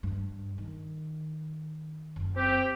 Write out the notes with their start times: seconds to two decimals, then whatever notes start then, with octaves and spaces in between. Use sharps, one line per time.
0.03 G2
0.58 D#3
2.16 F#1
2.36 C4 G4